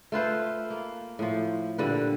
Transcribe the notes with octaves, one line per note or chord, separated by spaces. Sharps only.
A3 F4 B4 C5
A#3
A2 F3
A#2 D3 G3 B4